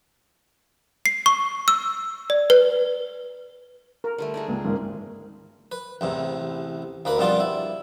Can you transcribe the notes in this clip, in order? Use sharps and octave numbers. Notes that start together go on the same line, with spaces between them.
C7
C#6
E6
D5
B4
A#4
D3 G3 A3
D4 D#4 G#4
C#2 A#3
G#1 G#2 A#4
B4
A1 E2 C3
D2 A#3 B4 B5
F2 B2 G3 D4 F4
E4